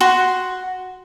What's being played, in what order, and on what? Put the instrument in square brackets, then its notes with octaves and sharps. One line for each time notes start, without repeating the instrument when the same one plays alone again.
[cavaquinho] F#4 C6